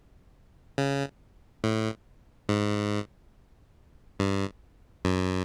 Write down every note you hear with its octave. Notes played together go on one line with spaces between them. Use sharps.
C#3
A2
G#2
G2
F#2